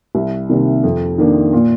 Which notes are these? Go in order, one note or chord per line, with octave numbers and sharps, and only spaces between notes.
C2
C3 D#3 G3 A#3
F2
D#3 A#3 D4
A#2